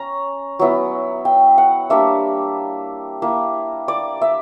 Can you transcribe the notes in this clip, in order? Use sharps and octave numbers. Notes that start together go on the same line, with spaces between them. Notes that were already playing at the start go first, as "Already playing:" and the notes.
Already playing: C#4 A#5
F#3 B3 E4
G5
F#5
G3 A#3 D4 E5
A#3 E4
D5
E5